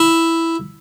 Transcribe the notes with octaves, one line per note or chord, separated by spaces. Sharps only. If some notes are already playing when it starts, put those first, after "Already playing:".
Already playing: E4